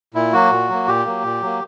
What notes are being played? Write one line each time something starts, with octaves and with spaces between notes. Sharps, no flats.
A#2 E4
F#3 A#3 F#4
A#2
F#3 A#3
A#2 G4
F#3 A#3
A#2
F#3 A#3